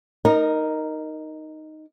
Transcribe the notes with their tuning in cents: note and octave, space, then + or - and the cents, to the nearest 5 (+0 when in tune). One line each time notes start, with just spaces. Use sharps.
D#4 +0 A#4 +0 D#5 -40